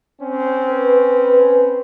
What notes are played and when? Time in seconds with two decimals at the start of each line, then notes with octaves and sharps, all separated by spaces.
0.21 C4 C#4
0.70 B4